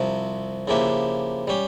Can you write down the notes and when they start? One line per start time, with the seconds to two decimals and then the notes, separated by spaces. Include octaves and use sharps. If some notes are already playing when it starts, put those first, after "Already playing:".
Already playing: C2 C3 F3
0.67 C#3 F3 A#3 E4 G4
1.48 G3 C#4 G4